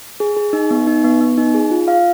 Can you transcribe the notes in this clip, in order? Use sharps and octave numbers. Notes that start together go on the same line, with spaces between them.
G#4
G#4
D#4
B3
D#4
B3
B3
D#4
G#4
F4
F5